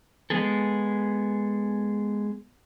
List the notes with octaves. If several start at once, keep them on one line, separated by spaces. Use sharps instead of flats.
G#3 B3 G#4 A4